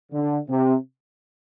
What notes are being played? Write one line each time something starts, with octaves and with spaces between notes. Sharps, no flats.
D3
C3